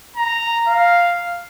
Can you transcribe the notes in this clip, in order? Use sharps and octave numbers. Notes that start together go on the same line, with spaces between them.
A#5
F5